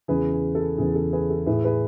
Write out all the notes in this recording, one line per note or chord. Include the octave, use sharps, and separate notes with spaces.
E2 C#3 E3 G#4 B4
G#4
A4
E2 C#3 E3 G#4
A4
G#4 B4
A4
A2 E3 G#4 B4
G#4 B4